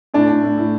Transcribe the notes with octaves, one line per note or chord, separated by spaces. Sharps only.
A2 D4
A2
A2
A2